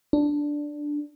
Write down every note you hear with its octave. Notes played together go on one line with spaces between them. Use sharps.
D4